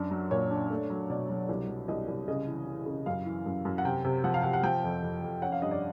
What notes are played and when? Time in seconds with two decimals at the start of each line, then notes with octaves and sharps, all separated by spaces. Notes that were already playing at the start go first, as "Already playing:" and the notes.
Already playing: F#2 D4
0.11 F#3
0.31 A#2 C#5
0.51 D4
0.70 A3
0.90 F#3
1.10 B2 D5
1.29 F#3
1.49 C2
1.69 F#3
1.88 C2 D#5
2.08 C2
2.28 C#3 D#5
2.48 E3
2.67 E3
2.86 C#3
3.06 F#2 F5
3.26 E3
3.46 F#2
3.65 F#2
3.78 F#5
3.85 C3 G5
4.04 C3
4.24 F3 F#5
4.34 F5
4.43 C3 F#5
4.53 F#5
4.63 F3 G5
4.84 F2
5.02 F2
5.22 F2
5.42 C#4 F#5
5.52 F5
5.62 G2 D#5
5.71 D5